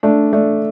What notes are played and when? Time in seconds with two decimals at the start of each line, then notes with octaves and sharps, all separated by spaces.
0.03 A3 D4
0.33 A3 D4